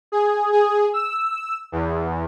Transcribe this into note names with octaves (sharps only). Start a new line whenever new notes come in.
G#4
G#4
E6
E2